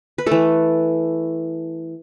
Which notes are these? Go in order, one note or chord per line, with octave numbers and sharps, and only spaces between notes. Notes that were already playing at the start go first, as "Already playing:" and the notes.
B4
E3 A3 A4